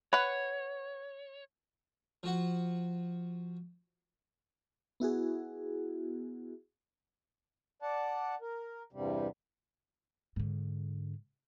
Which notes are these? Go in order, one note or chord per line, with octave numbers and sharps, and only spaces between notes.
B4 C#5 F#5
F3 F#4 F#5
B3 E4 F#4 G#4
D5 F#5 A5
A#4
E2 G2 C3 G3
G#2 D3